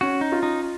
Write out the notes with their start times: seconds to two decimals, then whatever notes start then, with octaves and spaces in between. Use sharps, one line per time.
0.01 C#4 F#4
0.21 D#4
0.32 F4
0.43 D#4